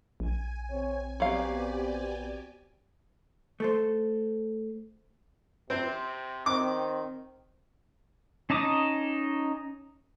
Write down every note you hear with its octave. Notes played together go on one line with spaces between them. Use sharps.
A#1 G#5
C3 C4 C#5
F#3 B3 C4 G4 D5 F5 G#5
A3 A4 C5
C3 C4 C5
D#3 C4 D6
C#4 D#4 A5 D6 D#6